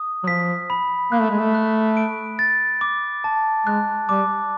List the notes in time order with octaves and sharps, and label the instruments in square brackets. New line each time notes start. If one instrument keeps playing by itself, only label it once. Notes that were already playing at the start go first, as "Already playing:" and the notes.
Already playing: [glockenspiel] D#6
[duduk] F#3
[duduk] F3 [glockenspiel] B6
[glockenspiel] B5
[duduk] A#3 [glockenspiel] F#6
[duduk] A3
G#3
A3
[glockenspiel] F#6
D7
A6
D6
A5
[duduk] G#3 [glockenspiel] F#6
[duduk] G3 [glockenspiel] D6